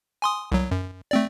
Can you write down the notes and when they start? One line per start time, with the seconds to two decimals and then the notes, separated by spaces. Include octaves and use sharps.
0.22 G#5 C6 D#6
0.52 C2 F#3
0.71 F#2
1.11 A3 C4 D5